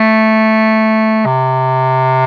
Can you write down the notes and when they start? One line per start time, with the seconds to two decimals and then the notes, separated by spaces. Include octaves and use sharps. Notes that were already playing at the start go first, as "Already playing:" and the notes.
Already playing: A3
1.26 C3